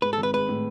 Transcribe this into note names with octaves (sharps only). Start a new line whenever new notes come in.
G#2 B4
A4
G#1
B4
G#3 B4
A2